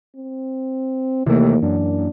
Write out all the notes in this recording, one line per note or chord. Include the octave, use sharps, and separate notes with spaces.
C4
D#2 C3 E3 A3 A#3
F#2 D4